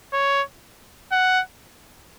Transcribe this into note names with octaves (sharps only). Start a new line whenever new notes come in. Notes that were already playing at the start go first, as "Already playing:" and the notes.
C#5
F#5